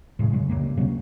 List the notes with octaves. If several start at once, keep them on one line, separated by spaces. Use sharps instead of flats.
A2 C#3 G#3
F#2 C#3 F#3 G#3
D#1 C#2 G2 A#3
C3 F#3 A#3 C#4